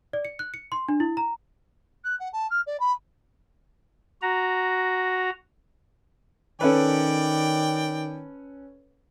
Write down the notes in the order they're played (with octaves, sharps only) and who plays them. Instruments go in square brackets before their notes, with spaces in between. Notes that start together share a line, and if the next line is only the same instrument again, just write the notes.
[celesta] D5
C#7
F#6
C#7
C6
D4
E4
A#5
[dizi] F#6
F#5
A5
F6
D5
B5
[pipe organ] F#4 A#5
[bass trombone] D#3 [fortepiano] C#4 A4 B4 [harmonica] D5 G5